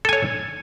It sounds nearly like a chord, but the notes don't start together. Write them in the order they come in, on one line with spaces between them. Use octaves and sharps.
A4 G#5 C#5